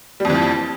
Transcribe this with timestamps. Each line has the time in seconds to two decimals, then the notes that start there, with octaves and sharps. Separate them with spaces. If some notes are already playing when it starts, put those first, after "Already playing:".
0.20 G3
0.25 F2
0.30 E3
0.35 F3